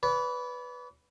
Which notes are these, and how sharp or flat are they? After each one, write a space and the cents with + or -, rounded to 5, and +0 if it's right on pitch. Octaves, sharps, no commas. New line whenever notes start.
B4 +0 D5 -40